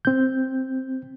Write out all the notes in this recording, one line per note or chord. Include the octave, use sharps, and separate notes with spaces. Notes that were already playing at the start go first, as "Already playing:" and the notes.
C4 G6